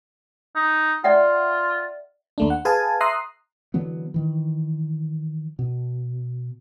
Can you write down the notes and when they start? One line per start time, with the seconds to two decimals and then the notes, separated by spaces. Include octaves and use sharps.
0.55 D#4
1.04 F4 D5 E5 F#5
2.38 D#2 A3 D4
2.50 F#5
2.65 G#4 B4 F5 G#5 A5
3.01 E5 A#5 C6 D#6 F#6 C7
3.74 D3 E3 F#3 B3
4.14 D#3 E3
5.59 B2